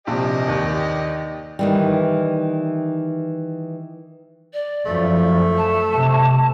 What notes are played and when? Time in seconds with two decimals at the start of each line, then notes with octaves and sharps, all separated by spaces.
0.07 A#1 C3 G4 D5 D#5
0.48 D#2
1.59 D#3 E3 G3
4.53 D5
4.86 F#2 F3 A3
5.57 A5
5.93 C3